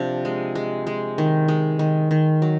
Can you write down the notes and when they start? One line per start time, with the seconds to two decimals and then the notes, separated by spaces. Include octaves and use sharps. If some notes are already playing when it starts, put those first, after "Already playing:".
Already playing: C3 F3 D4
0.25 G#3
0.55 G#3
0.87 G#3
1.18 D#3
1.48 G#3
1.79 D#3
2.11 D#3
2.42 F#3